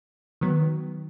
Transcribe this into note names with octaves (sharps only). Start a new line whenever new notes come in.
D#3 F#3 B3